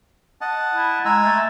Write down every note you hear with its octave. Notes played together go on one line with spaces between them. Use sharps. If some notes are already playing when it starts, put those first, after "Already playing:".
D#5 F#5 A5
E4
G#3 G#5 A#5 E6
A3